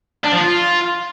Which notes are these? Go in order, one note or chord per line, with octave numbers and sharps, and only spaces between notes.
D4
F3
F4